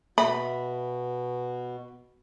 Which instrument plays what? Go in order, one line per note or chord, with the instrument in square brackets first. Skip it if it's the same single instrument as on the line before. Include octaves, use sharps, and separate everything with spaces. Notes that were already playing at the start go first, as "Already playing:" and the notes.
[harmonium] B2 [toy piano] E5 [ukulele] B5